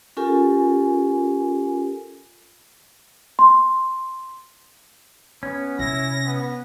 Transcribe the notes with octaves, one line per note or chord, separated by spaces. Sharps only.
C#4 F4 G4 A4 A#4 G#5
C6
B3 C#4
C3 E4 A#6
B3